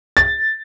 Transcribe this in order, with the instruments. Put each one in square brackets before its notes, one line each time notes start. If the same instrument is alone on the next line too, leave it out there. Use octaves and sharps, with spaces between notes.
[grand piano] A6